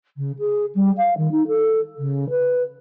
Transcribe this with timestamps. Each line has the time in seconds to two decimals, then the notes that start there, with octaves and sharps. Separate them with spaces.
0.17 C#3
0.38 G#4
0.74 G3
0.97 F5
1.17 D#3
1.31 D#4
1.47 A4
1.98 C#3
2.29 B4